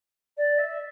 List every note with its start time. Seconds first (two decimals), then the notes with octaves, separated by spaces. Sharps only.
0.37 D5
0.59 E5